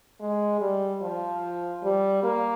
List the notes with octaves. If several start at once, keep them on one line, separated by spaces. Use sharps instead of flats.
G#3
G3
F3
G3
A#3